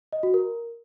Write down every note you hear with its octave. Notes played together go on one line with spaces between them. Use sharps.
D#5
F#4
A#4